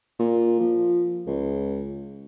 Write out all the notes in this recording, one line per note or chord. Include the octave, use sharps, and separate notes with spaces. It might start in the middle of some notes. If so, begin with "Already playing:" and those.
A#2
F3
C#2